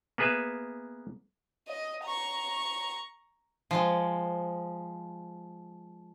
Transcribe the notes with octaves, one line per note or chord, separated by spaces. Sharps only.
A#3 B3 G#4 B4 E5
D#5
A#5 C#6
F3 G#3